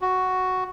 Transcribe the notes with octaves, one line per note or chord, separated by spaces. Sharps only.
F#4